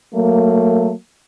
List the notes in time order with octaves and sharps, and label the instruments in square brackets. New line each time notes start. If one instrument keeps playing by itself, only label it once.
[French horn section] F#3 A3 A#3